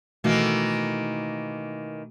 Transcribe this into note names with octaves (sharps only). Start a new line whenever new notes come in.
B2 D#3 E3 A3 A#3 F#4